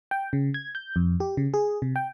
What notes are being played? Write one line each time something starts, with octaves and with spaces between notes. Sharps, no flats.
G5
C#3
G#6
G6
F2
G4
C#3
G#4
C3
G5